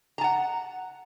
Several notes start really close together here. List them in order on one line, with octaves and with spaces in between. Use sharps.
A#5 A5 F#5